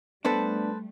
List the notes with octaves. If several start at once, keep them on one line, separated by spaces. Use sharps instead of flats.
G3 A3 B3 D4 A4 B4 C5